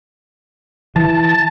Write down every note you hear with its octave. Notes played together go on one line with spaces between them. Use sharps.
E3 A5